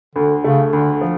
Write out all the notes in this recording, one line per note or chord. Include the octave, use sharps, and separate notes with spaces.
D2 D3
C#3 A3
D2 D3
F3